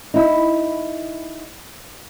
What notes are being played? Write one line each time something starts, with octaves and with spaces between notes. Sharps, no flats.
D#4 E4